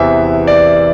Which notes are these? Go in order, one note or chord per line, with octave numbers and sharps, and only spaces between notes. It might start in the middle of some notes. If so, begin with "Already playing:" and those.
Already playing: E2 C3 E3 E5
D5